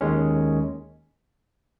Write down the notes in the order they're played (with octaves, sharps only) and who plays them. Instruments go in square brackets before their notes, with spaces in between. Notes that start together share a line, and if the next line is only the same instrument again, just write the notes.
[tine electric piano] D#2 D#3 G#3 C#4